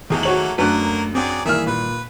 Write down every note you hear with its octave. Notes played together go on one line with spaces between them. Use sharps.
E2 D#3 F#3 A3 A#3 G#4 A#5
F#4 C#5 F#7
F#2 F#3 A3 A#3 D4 A#4 B4 F#6
F#3 C4 G#4 D5 G5
G2 D#3 E3 A#3 G#4 E5 F6
A#2 B4